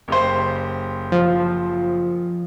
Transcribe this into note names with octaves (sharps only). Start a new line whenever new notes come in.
F#1 G4 C5
F3